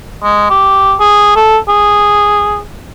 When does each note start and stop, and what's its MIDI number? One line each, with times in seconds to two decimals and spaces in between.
0.23 0.45 56
0.50 0.95 67
1.00 1.32 68
1.36 1.57 69
1.68 2.61 68